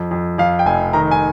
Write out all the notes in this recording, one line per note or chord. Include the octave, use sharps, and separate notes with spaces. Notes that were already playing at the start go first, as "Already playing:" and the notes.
Already playing: F2
F2
F2 F5
G5
F1 G#5
D#3 A#5
G#5